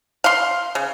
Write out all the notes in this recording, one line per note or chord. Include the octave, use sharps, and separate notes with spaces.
F5 C6
C#3